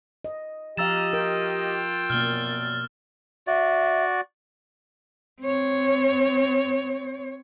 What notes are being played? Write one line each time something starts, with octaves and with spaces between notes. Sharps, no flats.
D#5
F3 G4 D#5 F5 A#5 E6 A6 E7
F4 A#4 G5
F#2 B2 A#3 D5 F6 G7
F#4 D5 E5
C4 C#5